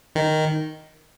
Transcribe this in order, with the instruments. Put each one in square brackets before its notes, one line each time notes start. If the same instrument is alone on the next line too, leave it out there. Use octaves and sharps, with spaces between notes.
[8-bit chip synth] D#3